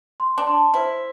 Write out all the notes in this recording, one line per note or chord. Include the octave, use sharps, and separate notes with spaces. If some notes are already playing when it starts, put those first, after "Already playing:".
C6
D4
C6
E4 C5